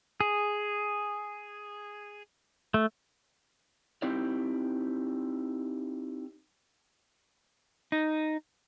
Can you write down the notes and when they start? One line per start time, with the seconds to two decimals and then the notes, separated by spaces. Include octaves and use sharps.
0.21 G#4
2.74 A3
4.02 C4 D#4 E4 G4 C5 D5
7.92 D#4